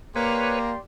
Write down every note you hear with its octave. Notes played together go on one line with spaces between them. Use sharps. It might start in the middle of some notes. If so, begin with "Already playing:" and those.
A#3 G4 B4 C#5 D5 C6